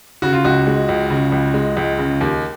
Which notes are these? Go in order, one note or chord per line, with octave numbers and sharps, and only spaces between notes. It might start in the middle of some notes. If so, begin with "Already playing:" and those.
C#3 F#4
F4
C#2 F#4
G#3
C#2
C#3
C#2
G#3
C#2
C#3
D#2